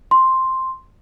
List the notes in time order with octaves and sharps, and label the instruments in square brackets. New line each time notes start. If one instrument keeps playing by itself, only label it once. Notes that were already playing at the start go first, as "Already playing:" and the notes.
[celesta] C6